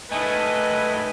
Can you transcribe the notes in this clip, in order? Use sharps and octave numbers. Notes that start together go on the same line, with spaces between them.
G#2 D#3 A3 E4 B4 D#5 G#5